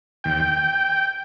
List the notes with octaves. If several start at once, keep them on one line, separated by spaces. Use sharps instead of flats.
D#2 G5